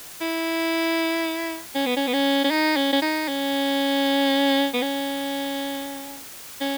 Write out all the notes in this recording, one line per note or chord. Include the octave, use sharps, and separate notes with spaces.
E4
C#4
B3
C#4
B3
C#4
C#4
D#4
C#4
C#4
D#4
C#4
B3
C#4
C#4